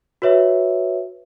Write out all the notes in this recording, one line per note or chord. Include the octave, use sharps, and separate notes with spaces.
F#4 B4 C#5 E5